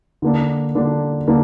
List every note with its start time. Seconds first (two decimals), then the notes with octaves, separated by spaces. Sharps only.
0.22 D3 A#3 D4
0.75 D3 A#3 D4
1.27 D3 A#3 D4